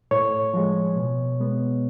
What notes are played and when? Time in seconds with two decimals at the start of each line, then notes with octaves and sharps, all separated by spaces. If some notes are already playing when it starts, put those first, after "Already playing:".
0.11 A2 C#5
0.54 F3 G#3
0.96 B2
1.40 G#3 B3